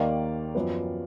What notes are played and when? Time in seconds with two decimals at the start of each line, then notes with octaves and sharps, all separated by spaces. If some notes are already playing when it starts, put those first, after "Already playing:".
Already playing: D#2 D#3 A#3 D5 F5
0.55 F#2 F3 B3